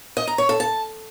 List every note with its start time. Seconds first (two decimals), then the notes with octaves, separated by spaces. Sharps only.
0.17 D#5
0.27 A#5
0.38 C#5
0.49 A4
0.60 A5